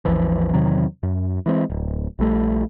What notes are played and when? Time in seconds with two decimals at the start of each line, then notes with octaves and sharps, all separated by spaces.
0.05 G#1 D#2 E3 F3
0.53 E2 C3 D#3 F#3
1.03 F#2
1.46 E3 G#3 C4
1.70 D1
2.19 A#1 G3 A3